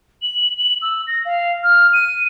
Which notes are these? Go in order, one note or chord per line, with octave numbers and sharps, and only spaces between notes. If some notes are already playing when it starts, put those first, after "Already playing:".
F#7
F#7
E6
A#6
F5
F6
D#7